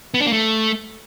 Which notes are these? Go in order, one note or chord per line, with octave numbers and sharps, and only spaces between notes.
B3
D4
A#3
A3